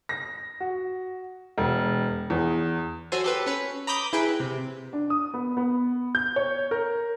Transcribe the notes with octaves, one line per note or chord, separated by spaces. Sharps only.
A#6
F#4
E1
E2
F#3 A4 C5 G#5
G4 A4 B4
C#4 B4
A#5 B5 D6 D#6 G6 B6
E4 G#4 B4 G5
C3
D4
D#6
B3
B3
G6
C#5
A#4